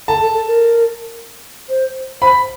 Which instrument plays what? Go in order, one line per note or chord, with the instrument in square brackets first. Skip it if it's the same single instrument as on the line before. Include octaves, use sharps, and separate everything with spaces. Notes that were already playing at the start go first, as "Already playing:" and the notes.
[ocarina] A4 [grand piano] A5
[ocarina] A4
A4
A#4
C5
[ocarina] C5 [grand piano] B5